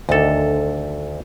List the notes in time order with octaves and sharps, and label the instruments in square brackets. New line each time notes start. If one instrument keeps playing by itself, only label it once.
[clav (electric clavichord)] D2 A4 [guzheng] D3 D#3